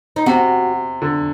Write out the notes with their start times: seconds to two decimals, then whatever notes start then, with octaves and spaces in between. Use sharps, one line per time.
0.16 D#4
0.26 C3 F#4
1.02 D3